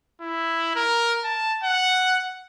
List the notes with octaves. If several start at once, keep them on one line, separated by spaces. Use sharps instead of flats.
E4
A#4
A5
F#5